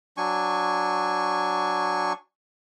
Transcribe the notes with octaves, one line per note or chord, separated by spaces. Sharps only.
F#3 D4 G#5 C#6